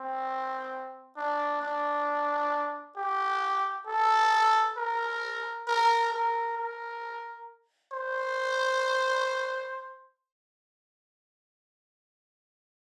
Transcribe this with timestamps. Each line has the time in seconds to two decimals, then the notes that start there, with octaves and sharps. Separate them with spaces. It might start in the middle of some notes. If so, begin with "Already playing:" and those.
Already playing: C4
1.17 D4
1.62 D4
2.97 G4
3.87 A4
4.77 A#4
5.67 A#4
6.12 A#4
6.57 A#4
7.92 C5